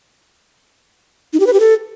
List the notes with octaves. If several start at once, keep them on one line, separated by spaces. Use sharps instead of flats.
D#4
G4
B4
G4
A4